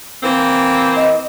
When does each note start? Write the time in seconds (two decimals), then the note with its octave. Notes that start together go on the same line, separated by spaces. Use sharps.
0.23 E3 A#3 C4
0.96 D#5